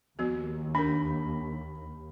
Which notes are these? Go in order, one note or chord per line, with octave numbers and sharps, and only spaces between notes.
D#2 F3 B3 F#4
D4 A#4 B5